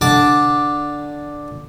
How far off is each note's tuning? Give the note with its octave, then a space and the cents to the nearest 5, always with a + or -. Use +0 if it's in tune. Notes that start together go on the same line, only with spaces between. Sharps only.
D3 +0 A5 +0 D6 +0